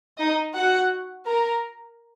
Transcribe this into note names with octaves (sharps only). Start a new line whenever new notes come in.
D#4 D#5
F#4 F#5
A#4 A#5